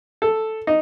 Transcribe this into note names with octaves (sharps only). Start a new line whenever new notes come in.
A4
D#4